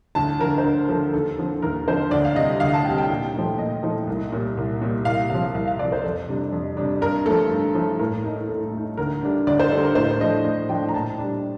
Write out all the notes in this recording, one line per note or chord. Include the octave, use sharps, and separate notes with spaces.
D2 A5
D3 F3 A#4
C5
D2 A#4
D3 F3 A4
D#2 A4
D3 F3 C4
D#2 A#4
D3 F3 C4 C5
D2 D5
F5
C3 G3 D#5
D2 F5
A5
C3 G3 G5
G5
A#2
F3 A3 D#4
A#2 D#5
F3 A3 D#4
C2
A#2 G3
C2
A#2 G3
C2 F5
C3 F3 F5
C2 F5
F5
C3 F3 D5
C5
F2 A4
C3 G3 D4
F2
C3 G3 D4
G2 A#4
F3 A3 A4
G2
F3 A3
A2 A#4
A3 D#4
A2 A4
A3 D#4
D2 A#4
D3 G3 D4
D2 D5
C5
D3 G3 D4 A4
A#4
A2 C5
F3 A3 D4 D#5
A2 D#5
F3 A3 D4 G5
A#5
A#2 A5
G3 D4